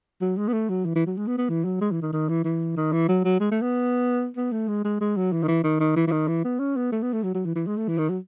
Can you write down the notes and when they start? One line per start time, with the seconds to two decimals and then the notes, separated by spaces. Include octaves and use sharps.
0.21 F#3
0.37 G#3
0.48 B3
0.53 A3
0.69 F#3
0.85 E3
0.95 E3
1.07 F#3
1.17 G#3
1.28 B3
1.38 B3
1.49 E3
1.65 F#3
1.81 G#3
1.92 E3
2.02 D#3
2.13 D#3
2.29 E3
2.44 E3
2.77 D#3
2.93 E3
3.09 F#3
3.25 F#3
3.40 G#3
3.51 A3
3.62 B3
4.37 B3
4.52 A3
4.68 G#3
4.85 G#3
5.01 G#3
5.17 F#3
5.33 E3
5.43 D#3
5.48 E3
5.64 D#3
5.80 D#3
5.96 E3
6.08 E3
6.12 D#3
6.28 E3
6.45 B3
6.60 C#4
6.76 B3
6.92 A3
7.03 B3
7.13 A3
7.24 F#3
7.34 F#3
7.46 E3
7.56 E3
7.67 G#3
7.77 A3
7.88 E3
7.98 D#3
8.09 F#3